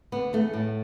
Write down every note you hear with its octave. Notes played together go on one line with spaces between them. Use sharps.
D3 B3
E2 A3
A2